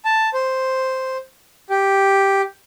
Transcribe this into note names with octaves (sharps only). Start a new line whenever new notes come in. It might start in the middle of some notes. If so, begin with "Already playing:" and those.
A5
C5
G4